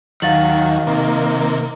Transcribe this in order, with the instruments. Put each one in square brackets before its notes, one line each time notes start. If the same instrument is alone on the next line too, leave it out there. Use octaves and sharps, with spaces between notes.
[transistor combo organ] D#2 F#3 [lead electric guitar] D#3 [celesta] F5 A6 F#7
[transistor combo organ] C3 A#3